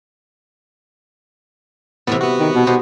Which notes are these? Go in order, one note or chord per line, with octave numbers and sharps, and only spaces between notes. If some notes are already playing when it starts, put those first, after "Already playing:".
A2 C3 E3 G3 B3
B3 F#4
D#3
B2
B2 G4 C5 D#5